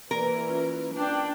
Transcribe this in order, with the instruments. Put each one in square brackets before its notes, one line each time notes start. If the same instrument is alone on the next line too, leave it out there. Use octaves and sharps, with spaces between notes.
[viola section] E3 [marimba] A#3 D5 [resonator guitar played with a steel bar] A#4
[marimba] C#4 F4
[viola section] D4 G5